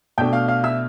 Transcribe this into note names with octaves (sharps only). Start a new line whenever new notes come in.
B2 A3 D4 G5 G6
F5 F6
F5 F6
E5 E6